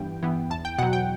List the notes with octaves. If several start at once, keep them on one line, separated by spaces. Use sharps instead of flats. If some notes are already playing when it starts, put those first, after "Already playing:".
Already playing: G2 E3 B3 G5
E3 B3
E2 A5
G5
B2 F#3 F#5
G5